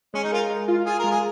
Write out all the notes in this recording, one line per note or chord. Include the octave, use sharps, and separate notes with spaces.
G#3 C#4
D#4
F4 A#4
G#3
F4
F4 G#4
A#4
G#3
G#4